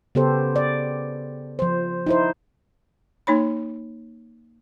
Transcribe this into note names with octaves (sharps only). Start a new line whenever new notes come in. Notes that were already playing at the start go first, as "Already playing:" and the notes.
C#3 B3 G4 A4 C5
D5
F3 C5
D#4 E4 C5
A#3 D#4 C#5 B5